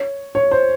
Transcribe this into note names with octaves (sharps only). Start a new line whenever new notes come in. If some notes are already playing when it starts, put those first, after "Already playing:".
Already playing: C#5
C#5
C5